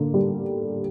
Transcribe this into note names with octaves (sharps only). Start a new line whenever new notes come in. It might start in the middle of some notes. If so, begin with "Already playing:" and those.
Already playing: D3 A#3
G3